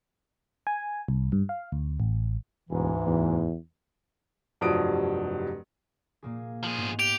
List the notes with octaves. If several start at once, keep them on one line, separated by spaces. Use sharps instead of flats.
G#5
C2
G2
F5
D2
A1
E1 D2 G#2 E3
E2
F1 G2 F3 F#3 D#6 D7
A#2 A#3 G#4
F3 G#4
G#2 B3
G4 D7 F7